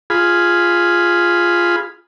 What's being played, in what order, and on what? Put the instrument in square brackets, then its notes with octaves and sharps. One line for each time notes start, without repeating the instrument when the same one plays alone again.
[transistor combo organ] F4 G#4 B5